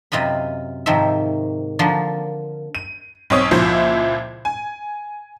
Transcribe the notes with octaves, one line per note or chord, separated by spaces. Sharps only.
F#2 C3 F4 D#5 B5
G#2 C3 D#3 F3 C5 E5
D3 F3 A#3
D#7
B1 C4 C#5 D#6
C#2 A#2 F3 E4 C5 E5
G#5